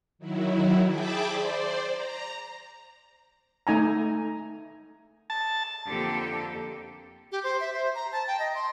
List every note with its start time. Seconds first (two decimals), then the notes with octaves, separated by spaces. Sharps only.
0.18 D#3 F#3 E4
0.88 G#4 E5 G5 A5 B5 D6
1.25 C5 D5
1.91 A#5
3.67 A3 D#4 G#5 A#5
5.30 A5
5.88 F2 D3 A#3 G4 A4
7.32 G4
7.44 C5
7.60 E5
7.74 C5
7.95 A#5
8.12 A5
8.27 G5
8.39 D#5
8.55 C6